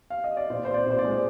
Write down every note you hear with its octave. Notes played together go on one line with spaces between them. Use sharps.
F5
D#5
D5
A#2 C5
C4 C5
D5
A#2 C5
D5
G#3